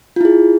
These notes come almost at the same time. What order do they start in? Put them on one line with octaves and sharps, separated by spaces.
F4 E4 G#4